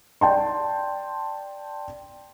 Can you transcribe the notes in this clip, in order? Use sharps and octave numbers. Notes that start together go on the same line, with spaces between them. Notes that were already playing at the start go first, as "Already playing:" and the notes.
D5 G5 A5 C6